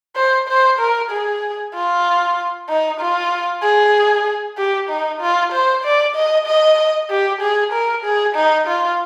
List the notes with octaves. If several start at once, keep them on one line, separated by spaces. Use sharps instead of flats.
C5
C5
A#4
G#4
F4
D#4
F4
G#4
G4
D#4
F4
C5
D5
D#5
D#5
G4
G#4
A#4
G#4
D#4
F4